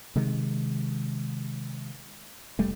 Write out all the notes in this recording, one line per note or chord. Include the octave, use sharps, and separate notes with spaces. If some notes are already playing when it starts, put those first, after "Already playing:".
C3 D#3 G#3
F1 G3 A3